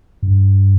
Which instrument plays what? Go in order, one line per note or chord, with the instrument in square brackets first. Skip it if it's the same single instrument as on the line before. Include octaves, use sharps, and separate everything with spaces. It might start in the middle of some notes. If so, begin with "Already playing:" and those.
[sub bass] G2